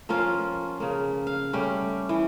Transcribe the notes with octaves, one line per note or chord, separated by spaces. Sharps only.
F3 A#3 C#4 F4
C#3 A#3
F5
G3 A3 C#4 G4
E3